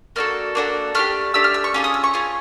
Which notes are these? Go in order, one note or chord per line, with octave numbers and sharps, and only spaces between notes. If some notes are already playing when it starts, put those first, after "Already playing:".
A#3 D4 F#4 A4 F6
A#3 D4 F#4 A4
A3 D4 G4 F6
A3 D4 G4 E6
F6
E6
C#6
C#4 F4 G#4 D6
D#6
E6
C#6
C#4 F4 G#4